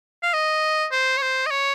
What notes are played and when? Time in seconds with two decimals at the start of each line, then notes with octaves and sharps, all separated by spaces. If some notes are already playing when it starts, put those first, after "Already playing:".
0.23 F5
0.33 D#5
0.92 C5
1.17 C#5
1.22 C5
1.46 D#5
1.51 C#5